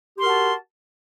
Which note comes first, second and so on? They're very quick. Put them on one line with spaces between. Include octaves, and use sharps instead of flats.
G4 C6 A#4 F#4 A5